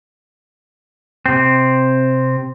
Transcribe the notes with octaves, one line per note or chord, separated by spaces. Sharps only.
C3 C4